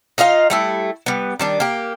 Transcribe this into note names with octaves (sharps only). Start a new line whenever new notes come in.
D#4 F4 D#5 F5
G3 A3 E4
G3 B3
D#3 G3 D4
A#3 G4